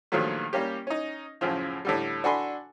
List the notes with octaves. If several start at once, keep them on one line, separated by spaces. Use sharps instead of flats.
G2 A#2 D#3 F3 F#3 A3
G3 A#3 C#4 G4
C#4 D#4
F#2 A2 C#3 F3
A2 D3 G3
D4 F#4 A4 G#5 B5 C6